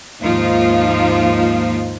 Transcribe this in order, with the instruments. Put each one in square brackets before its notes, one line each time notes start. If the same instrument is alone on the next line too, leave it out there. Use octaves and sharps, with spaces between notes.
[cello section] D#2 G#2 F3 A#3 D#4 F4